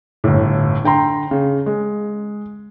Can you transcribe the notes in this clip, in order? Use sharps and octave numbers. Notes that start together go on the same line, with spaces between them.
G1 A2
D3 G5 A#5 C6
C#3
G#3